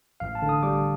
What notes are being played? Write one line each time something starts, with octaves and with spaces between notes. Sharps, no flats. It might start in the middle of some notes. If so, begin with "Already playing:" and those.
A1 F5
A5
D3
D#6
G3 D6